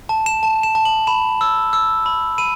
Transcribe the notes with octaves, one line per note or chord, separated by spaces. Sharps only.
A5
E7
A5
E7
A5
F#7
B5 E7
E6
E6
B5
B5 D#7